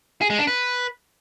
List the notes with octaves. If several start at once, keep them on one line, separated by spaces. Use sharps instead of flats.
G#4
G#3
D4
B4